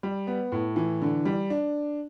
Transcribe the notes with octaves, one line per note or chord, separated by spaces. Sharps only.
G3
B3
A2
E3
D3
G3
D4